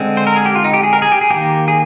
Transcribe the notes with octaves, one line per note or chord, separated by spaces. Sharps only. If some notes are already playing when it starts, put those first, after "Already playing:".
Already playing: D3 G#3 C4
C5
A#4
G#4
G4
F4
D#4
G4
G#4
A#4
G#4
G4
G#4
D#3 A#3 G4
G#4